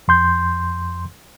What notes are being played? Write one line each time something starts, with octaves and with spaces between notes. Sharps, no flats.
F2 C6 G6